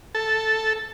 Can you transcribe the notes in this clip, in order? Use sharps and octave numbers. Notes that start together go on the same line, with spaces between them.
A4